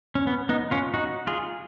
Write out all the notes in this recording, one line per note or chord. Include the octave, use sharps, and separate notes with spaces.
C#4
B3
B3 D#4
C#4 F4
D#4 F#4
F4 G#4